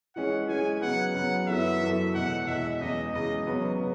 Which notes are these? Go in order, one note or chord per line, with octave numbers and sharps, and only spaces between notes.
E3 G#3 C#4 G#4 F#5
E3 G#3 C#4 G#4 G#5
C#3 F#3 B3 F#5
C#3 F#3 B3 F#5
F#2 E3 B3 F#4 A4 E5
F#2 E3 B3 F#4 A4
E2 B2 G#3 F#5
E2 B2 G#3 E5
E2 C#3 G#3 D#5
E2 C#3 G#3 D#5
C#3 F#3 B3 F#4
C#3